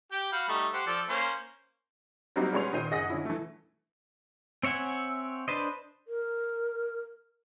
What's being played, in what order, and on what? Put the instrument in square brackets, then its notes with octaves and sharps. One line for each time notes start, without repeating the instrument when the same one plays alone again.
[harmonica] G4 G5
F#4 F5 B5
G3 A3 D#4
G4 C5 F#5
F3 A4 D5
A#3 C#4 C5
[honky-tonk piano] F#3 G3 A#3 C4 D#4 F#4
G3 G#3 B3 C#4 C6 F7
A#2 D#3 C5 D#7
F#1 G#4 D#5 F#5 D#6 A#6
D3 C#4 E4
E3 A3
[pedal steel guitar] C4 C#5 E5 F#5 G#5
D4 B4 C5 D#5
[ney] A#4